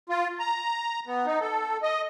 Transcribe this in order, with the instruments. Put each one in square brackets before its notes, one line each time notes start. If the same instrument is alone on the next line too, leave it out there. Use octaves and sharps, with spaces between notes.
[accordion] F4
A#5
B3
D#4
A4
D#5